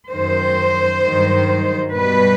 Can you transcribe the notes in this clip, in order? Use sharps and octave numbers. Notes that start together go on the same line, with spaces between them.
F#2 D#3 F#3 C5
G2 D#3 F#3
B2 G3 B4